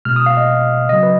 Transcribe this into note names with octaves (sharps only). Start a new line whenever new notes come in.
B2 G#3 F6
D#6
F5
D#5
C#3 F#3 D#5
B4